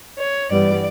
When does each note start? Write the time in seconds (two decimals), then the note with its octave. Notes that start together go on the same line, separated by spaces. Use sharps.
0.18 C#5
0.50 G2 E3 G3 B3 D5